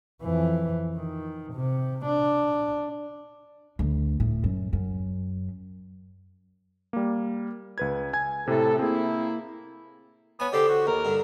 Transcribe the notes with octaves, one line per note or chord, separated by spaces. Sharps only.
F2 E3
D#3
C3
D4
D2
A2
F#2
F#2
G3 A#3
C#2 B4 G#6
G#5 G#6
A2 C3 E4 A4
A#3 C4 E4 G#4
B3 C#5 G#5
D3 G4 A4 C5
F#4
D#2 A#4
G2 D3